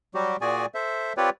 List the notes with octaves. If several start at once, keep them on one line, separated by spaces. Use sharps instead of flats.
F#3 G3 F#4 G4
A#2 F#4 G#4 D5 G#5
A4 C5 E5
C4 F4 G4 B4 C#5 D5